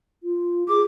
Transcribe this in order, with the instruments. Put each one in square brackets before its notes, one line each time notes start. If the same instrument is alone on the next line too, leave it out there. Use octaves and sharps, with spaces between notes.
[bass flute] F4
[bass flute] G#4 [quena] D6